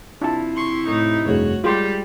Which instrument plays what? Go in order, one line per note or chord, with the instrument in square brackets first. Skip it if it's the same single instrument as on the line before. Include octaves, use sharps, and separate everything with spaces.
[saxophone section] C3 E4 [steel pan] D4 F4 A5
[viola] C6 C#6
[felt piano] A2 [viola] D#4
[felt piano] F1 G2 G#4 [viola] F#4 C#5
[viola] G3 G4 [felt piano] G#3 [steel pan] F4 C6